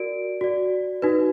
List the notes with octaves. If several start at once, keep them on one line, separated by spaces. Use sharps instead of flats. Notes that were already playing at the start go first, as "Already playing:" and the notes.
Already playing: F#4 A#4 D5 D7
F#4 D5
D#4 F#4 B4